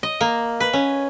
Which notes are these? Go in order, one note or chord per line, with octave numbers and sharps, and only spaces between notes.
D#5
A#3
B4
C#4